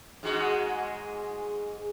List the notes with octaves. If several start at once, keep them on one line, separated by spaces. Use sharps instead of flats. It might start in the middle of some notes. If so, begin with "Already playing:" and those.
G#2 G#3 F#4